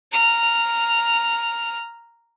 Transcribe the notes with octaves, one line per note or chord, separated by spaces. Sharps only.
A#5 F6